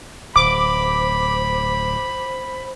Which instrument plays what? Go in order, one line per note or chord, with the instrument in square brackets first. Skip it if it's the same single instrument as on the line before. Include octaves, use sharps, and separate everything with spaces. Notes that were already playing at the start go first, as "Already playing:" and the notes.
[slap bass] D1 [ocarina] C5 [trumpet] B5 [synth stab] D6